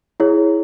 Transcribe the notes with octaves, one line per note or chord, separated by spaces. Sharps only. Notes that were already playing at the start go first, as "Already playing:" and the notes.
E4 G#4 C#5